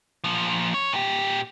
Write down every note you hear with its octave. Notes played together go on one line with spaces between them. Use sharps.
A#2 F3
C#5
A#2 G4